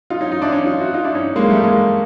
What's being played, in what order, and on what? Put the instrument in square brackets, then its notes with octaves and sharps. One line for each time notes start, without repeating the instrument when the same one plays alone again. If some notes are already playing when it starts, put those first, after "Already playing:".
[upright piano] D#4 F4
C#4 D#4
D#4 F4
D4 E4
C#4 D#4
D#4 F4
E4 F#4
D#4 F4
D4 E4
C#4 D#4
G#3 A#3
G3 A3
G#3 A#3